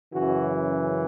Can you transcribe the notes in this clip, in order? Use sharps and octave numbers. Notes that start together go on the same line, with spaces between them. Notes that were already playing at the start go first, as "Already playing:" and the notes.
F#2 C#3 E3 F#4